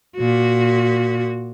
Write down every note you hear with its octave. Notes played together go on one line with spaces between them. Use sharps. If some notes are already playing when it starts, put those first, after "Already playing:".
A#2 F#4